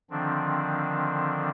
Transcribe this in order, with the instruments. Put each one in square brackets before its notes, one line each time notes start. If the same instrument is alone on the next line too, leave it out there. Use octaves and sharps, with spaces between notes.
[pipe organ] D3 D#3 F3 C4 D4